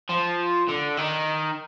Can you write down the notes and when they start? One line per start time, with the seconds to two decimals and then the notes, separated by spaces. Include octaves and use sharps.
0.09 F3
0.68 D3
0.97 D#3